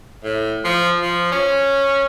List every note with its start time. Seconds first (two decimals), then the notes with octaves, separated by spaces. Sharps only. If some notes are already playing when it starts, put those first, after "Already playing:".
0.24 A2
0.65 F3
1.02 F3
1.32 C#4